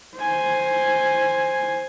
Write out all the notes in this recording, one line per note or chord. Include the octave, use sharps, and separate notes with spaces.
C5 G#5